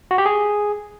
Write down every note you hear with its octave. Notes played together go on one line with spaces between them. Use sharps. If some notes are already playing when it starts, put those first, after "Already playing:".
F#4
G4
G#4